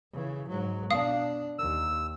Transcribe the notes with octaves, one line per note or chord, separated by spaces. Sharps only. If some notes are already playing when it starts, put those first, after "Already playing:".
C#3 E3
G#2 F#3
B2 D4 F5 D#6
D#2 E6